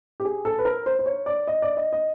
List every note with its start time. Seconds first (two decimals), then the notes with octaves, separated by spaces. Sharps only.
0.20 G4
0.25 G#4
0.45 A4
0.59 B4
0.65 A#4
0.86 C5
0.99 C5
1.06 C#5
1.26 D5
1.47 D#5
1.62 D5
1.77 D#5
1.93 D#5